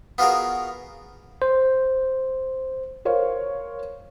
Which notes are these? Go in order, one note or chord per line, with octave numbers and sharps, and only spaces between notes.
B3 F4 F#4 G#4 A#4
C5
A#4 C5 C#5 F5